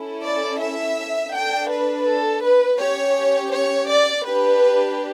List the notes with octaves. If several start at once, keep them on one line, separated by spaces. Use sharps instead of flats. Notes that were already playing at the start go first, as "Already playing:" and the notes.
Already playing: C#4 E4 A4
D5
E5
D4 A4 G5
B4
A4
B4
C#4 G4 C#5
C#5
D5
D4 G4 B4